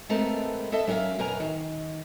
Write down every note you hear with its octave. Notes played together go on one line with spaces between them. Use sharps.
G#3 A3 B3 C4 A4 A#4
A4 D#5 E5 A5
F#3 C#4 A#4 E5 F5
F#2 B2 A#4 B4 G#5 A#5
D#3